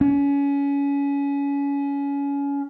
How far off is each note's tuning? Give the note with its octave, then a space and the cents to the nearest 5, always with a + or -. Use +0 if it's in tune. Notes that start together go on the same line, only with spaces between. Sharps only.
C#4 +25